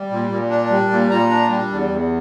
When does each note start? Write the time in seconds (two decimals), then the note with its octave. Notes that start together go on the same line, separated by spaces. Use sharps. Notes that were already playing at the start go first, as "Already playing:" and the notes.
Already playing: G3
0.11 A#2
0.30 A#2
0.50 D4
0.70 G3
0.90 A#2
1.10 A#2 A#5
1.29 D4
1.49 G3
1.70 E2
1.89 E2